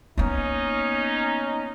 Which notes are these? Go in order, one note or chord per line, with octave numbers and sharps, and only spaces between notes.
A#3 B3 C#4 D#4